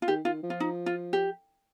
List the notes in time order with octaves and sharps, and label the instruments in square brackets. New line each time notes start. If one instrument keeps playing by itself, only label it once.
[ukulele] F4
[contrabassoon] D#3 [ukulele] G4
[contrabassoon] D#3 [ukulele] F4
[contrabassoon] F3
[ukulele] F4
D#4
F4
G4